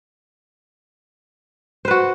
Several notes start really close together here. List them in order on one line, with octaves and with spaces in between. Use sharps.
C5 B4 F#4